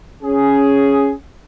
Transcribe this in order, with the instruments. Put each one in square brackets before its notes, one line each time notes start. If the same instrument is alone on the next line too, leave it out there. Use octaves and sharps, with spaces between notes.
[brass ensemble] C#4 G#4